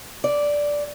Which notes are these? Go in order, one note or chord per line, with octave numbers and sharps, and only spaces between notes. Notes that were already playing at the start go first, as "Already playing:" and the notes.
D5